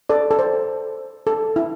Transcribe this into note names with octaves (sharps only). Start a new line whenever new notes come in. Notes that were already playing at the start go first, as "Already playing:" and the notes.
A4 D5
A4
C5
A4
E4